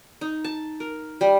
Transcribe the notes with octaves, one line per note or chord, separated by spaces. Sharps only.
D#4
A5
A#4
G3